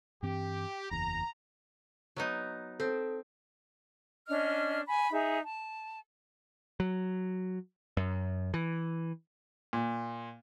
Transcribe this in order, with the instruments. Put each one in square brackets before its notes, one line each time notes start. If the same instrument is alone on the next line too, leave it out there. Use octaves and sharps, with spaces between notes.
[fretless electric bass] G2 E3 C4 [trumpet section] G4
[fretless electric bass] F#1 E2 [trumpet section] A#5
[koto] F#3 B3 D#4
[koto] C4 [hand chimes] A4
[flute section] C#4 D4 D#5 F6
G#5 B5
D#4 G#4 E5
A5
[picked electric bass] F#3
F#2
E3
[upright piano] A#2